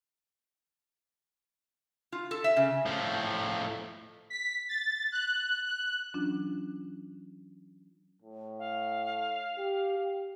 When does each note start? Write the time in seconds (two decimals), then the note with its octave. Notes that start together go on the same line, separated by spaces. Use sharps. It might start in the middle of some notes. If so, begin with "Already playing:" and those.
2.12 F4
2.31 A4
2.44 E5
2.56 C#3
2.86 A2 F3
4.30 B6
4.69 A6
5.12 F#6
5.66 F#6
6.14 E3 F#3 C#4 D4 F4
8.22 A2
8.59 F5
9.58 G4
9.98 G4